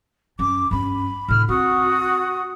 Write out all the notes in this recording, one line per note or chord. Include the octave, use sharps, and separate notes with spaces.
F#2 C#4 D6
G2 C#4 B5
A2 D3 F6
C4 F#4 D#6